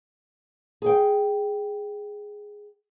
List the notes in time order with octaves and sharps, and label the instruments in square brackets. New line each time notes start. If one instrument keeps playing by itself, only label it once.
[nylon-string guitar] G#4 G5